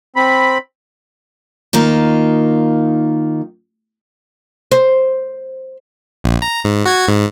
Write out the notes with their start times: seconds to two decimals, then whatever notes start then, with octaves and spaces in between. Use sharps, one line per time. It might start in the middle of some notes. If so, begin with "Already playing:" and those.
0.16 C4 B5
1.73 D#3 A#3 D#4 F4
4.72 C5
6.24 A#1
6.42 A#5
6.64 G#2
6.86 F#4 G#6
7.07 G#2